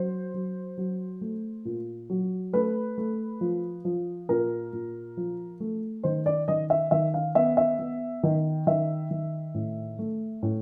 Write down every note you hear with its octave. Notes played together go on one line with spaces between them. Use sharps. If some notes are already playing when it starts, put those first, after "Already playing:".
Already playing: F#3 C5
F#3
F#3
A3
A#2
F#3
A3 B4
A3
F3
F3
A#2 A#4
A#2
F3
A3
D#3 C5
D5
D#3 D#5
E5
D#3 E5
F5
B3 E5
E5
B3
D#3
D#3 E5
D#3
A2
A3
A2